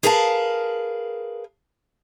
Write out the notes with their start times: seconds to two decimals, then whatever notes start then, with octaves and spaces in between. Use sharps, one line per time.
0.03 G#4 A#4 B4 F5 G#5 A5